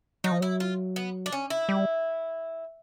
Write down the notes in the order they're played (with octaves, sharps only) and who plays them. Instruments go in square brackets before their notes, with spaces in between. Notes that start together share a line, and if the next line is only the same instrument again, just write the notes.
[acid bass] F#3 [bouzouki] D#4
[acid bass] F3
[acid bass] F#3 [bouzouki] E4
[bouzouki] F4
B3
D4
C#4
E4
[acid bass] G3